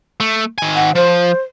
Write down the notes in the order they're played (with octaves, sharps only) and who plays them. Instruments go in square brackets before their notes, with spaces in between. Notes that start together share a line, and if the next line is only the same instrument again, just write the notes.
[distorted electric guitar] A3
D#3 G#5
[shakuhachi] F#5
[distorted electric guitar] F3 [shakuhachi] C5